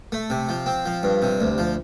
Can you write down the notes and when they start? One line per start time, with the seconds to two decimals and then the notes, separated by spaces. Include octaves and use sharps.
0.12 A3
0.30 C3
0.49 F3
0.66 C4
0.86 F3
1.03 G2
1.22 C3
1.41 D2
1.58 F3